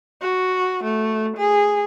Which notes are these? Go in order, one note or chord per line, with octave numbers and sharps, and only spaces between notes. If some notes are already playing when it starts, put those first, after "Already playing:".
F#4
A3
G#4